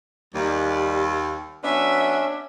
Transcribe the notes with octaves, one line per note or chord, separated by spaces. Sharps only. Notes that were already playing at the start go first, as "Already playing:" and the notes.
D#2 G3
F#3 B3 C#4 D4 E5